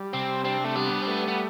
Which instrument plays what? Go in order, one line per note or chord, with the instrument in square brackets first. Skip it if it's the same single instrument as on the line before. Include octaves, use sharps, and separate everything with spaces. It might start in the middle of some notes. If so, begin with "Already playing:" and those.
Already playing: [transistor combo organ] G3
[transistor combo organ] C3 [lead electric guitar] C4
[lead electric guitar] C4 [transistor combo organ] D4
[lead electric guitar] A3
[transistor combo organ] G3 [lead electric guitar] B3
[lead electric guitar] C4
[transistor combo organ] A3 [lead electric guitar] B3
[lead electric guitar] B3